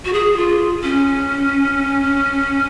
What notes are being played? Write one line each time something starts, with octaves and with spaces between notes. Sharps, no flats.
F#4
G#4
F4
C#4